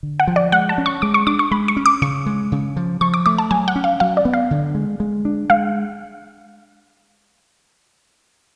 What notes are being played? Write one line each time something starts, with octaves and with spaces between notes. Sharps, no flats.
D3
F#5
F3
D5
G#3 F#5
A5
C#4
C#6
G#3 D6
C#6
D4 D6
C#6
G#3 B5
C#6
C#4
D6
C#3 C#6
G#3
C#3
F3
F3 C#6
D6
A3 D6
A5
F#3 G#5
F#5
C#4
F5
F#3 F5
D5
B3
F5
D3
G#3
G#3
D4
G#3 F5